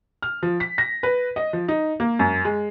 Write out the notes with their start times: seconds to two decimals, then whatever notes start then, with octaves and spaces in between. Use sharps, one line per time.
0.22 F6
0.43 F3
0.60 B6
0.78 A#6
1.03 B4
1.36 D#5
1.53 F3
1.68 D#4
2.00 A#3
2.19 F#2
2.45 G#3